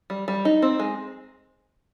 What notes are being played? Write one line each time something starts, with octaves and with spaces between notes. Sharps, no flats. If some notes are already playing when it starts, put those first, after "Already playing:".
G3
G3
D#4
C4
G#3